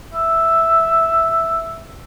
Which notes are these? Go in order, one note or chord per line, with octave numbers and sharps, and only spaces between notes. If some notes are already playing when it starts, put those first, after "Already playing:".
E5